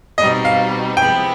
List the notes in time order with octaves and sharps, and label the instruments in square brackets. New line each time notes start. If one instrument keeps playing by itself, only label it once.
[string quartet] B2 G3 C4 D#4 [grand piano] D#5
[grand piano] F5
[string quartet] C3 F3 G#3 B3 E4 [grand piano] G5